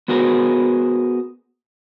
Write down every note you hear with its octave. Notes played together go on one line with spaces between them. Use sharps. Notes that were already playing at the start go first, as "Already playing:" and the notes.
B3 F#4 G#4 A#4 C5